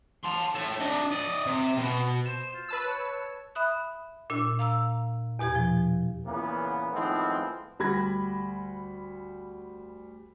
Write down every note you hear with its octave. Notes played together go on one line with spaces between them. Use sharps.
A5 C6
A4 C#5
D4 D#5
D5 D#5
C3
B2
C5 E7
F4
B4 A5 E6
C#5
E5 B5 D#6 F#6
A#2 D4 E6
F5 A#5 E6
E2 B2 G4 G#6
F3
A#2 C#3 E3 A#3 B3
A2 D#3 F3 G#3 B3 C4
D2 G3 B5 G#6 A#6